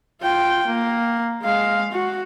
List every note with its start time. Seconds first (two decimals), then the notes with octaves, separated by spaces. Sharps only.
0.22 F4 G5
0.67 A#3
1.43 G#3 F5
1.92 F#4